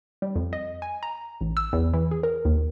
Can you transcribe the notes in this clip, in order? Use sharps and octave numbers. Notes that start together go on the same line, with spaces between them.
G3
F2
D#5
G#5
A#5
A1
E6
E2
E3
G#4
A#4
D#2